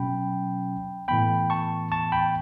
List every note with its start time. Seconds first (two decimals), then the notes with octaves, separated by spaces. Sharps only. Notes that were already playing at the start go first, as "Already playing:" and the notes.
Already playing: B2 F#3 C#4 G5 B5
1.08 A2 E3 B3 G5 B5
1.50 A5 C#6
1.92 A5 C#6
2.12 G5 B5